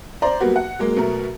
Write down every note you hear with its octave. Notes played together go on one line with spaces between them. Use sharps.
C5 D5 A#5
F#3 G3 A#3 B3 F#4
F#5
F#3 G#3 A#3
B2 F#3 A3 A#4